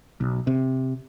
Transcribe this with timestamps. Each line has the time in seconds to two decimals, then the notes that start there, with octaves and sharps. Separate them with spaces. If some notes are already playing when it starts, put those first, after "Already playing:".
0.20 B1
0.47 C3